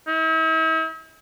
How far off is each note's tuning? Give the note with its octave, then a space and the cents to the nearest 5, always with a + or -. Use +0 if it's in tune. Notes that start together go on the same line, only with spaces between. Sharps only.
E4 -45